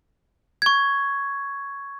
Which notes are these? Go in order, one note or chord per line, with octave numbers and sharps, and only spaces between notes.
C#6 G#6